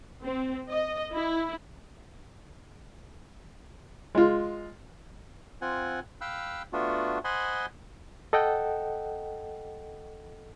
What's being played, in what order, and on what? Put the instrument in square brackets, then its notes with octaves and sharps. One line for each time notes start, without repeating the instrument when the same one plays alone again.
[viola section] C4
D#5
E4
[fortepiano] G#3 F4
[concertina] C4 F4 F#5 G#5
F5 G5 B5 E6 F#6
A3 B3 D4 F4 F#4
C5 D#5 F#5 G#5 B5 C6
[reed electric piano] A4 D#5 F#5 G5